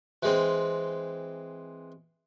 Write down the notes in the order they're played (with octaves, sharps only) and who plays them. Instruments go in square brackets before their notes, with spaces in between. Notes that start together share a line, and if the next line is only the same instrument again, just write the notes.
[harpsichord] E3 G#3 C4